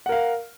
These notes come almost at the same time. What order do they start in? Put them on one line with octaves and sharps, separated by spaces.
F#5 A#4 F5